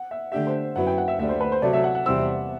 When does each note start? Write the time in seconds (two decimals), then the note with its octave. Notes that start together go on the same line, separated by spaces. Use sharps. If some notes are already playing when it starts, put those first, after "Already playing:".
Already playing: F#5
0.11 E5
0.32 D3 A3 D4 G4 E5
0.47 C5
0.75 F#2 F#3 B3 E4 F#5
0.87 G5
0.98 F#5
1.08 E5
1.19 D2 D3 G3 E5
1.29 C5
1.41 B4
1.52 C5
1.62 C3 F#3 A3 D5
1.73 E5
1.84 F#5
1.95 F#5
2.06 E2 C3 G3 C4 E4 E6